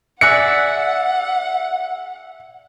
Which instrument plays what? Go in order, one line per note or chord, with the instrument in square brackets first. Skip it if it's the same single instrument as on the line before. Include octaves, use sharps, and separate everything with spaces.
[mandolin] G#4 D5 E5 [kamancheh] F#5 [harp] E6 F#6 A#6 [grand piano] C#7